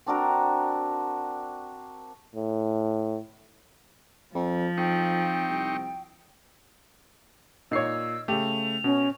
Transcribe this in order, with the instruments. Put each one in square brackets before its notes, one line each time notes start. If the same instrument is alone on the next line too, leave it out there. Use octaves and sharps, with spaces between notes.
[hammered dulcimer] C4 D4 F#4 A#4
[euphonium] A2
[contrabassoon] F2 [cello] F3
[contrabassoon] F2 [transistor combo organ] C4 D#4 C#6 [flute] G5
[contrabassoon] C2
[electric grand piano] A#2 C7 [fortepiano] D#4 C#5 [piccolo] E6
[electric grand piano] C#3 A3 [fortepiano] G4 [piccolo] F7
[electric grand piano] B2 [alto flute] C#4